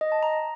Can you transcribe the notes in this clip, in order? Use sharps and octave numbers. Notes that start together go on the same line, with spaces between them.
D#5
A5
A#5